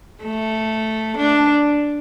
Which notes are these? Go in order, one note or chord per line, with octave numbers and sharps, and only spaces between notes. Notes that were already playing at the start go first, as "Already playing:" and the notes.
A3
D4